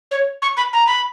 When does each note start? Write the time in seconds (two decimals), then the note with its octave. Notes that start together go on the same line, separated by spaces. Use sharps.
0.11 C#5
0.42 C#6
0.57 B5
0.73 A#5
0.87 B5